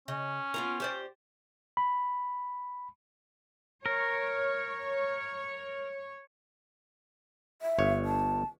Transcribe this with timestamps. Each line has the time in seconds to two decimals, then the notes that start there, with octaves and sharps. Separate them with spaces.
0.08 C#3 C#4 D#5
0.54 B3 F4 A#4
0.80 G4 C5 D5
1.77 B5
3.86 A#4 C#5
7.62 E5
7.79 G1 C#5
8.05 A5